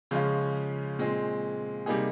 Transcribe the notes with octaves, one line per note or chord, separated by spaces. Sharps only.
C#3 F3 G#3 C#4 F4
A#2 G#3 C4
C3 G3 A#3 D#4 G#4